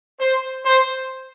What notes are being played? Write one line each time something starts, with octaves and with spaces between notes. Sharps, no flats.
C5
C5